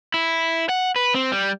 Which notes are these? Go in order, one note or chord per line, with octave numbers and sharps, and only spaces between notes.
E4
F#5
B4
C4
G3